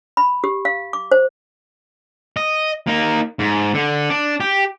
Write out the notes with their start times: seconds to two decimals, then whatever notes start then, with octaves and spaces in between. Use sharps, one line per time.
0.17 B5
0.44 G4
0.65 F5
0.93 D6
1.12 C5
2.37 D#5
2.87 A#3 D#4
3.39 G#2
3.74 D3
4.10 D4
4.40 G4